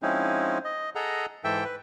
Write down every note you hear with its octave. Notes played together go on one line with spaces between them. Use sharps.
F3 G#3 C4 C#4 D#4 E4
D#5
G#4 A4 D#5 F#5 A#5
G#2 E3 A4 E5 G5
B4